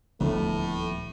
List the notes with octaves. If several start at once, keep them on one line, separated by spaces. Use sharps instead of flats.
D#1 D2 A2 F3 A3 B3